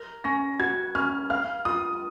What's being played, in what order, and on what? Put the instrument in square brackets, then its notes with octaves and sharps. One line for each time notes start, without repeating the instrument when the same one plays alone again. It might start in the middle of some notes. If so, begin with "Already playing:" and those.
Already playing: [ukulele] A#4
[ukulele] C#4 [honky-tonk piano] A#6
[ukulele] F#4 [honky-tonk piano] G#6
[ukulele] C#4 [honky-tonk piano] F6
[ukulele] F5 [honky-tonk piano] F6
[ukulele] F4 [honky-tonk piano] D#6